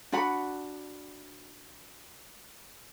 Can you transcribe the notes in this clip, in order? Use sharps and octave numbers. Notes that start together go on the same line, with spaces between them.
D4 F#4 F#5 B5